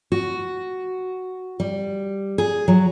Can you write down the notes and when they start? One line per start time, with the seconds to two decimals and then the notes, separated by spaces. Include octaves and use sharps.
0.12 F#4
1.60 G3
2.38 G#4
2.68 F#3